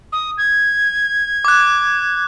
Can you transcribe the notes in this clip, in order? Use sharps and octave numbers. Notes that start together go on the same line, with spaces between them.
D#6
G#6
D6 F#6